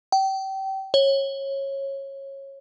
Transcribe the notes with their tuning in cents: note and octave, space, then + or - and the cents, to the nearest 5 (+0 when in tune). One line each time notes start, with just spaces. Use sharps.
G5 -30
C#5 -20